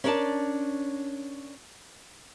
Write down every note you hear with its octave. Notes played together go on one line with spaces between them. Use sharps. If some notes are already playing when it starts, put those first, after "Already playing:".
C#4 D4 A#4 C#5 D5 A5